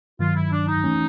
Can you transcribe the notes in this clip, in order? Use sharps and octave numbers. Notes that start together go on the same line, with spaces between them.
G2 D#3 F#3 F4
E4
D4
D#4
E3 A3 C#4